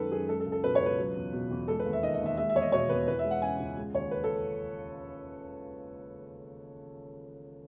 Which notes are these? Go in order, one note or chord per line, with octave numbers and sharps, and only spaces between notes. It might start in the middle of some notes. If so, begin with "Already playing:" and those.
Already playing: F#2 D#3 G#3 A4 B4
F#2 G#4
G#3 A4
A4
C#2
A4
B2 B4
C#5
C#2 B4
F#3
E2
B2
E2
G#3 A4
B4
D#2
E5
D#3 D#5
D#5
D#2
E5
G#3 E5
E5
E2 C#5
D#5
B2 C#5
E2 B4
E3 B4
E5
G#3
F#5
C#3 G#5
C#2
G#3
D#2 C#5
C#3 B4
A4